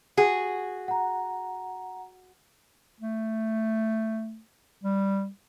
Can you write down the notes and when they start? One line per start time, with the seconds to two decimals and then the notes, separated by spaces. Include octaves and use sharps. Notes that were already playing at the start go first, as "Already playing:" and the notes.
0.17 F#4 G#4
0.88 F#5 A#5
3.01 A3
4.84 G3